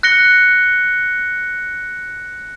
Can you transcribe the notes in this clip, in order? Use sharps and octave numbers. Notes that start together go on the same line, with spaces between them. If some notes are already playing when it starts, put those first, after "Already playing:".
F#6 A#6 C#7 G7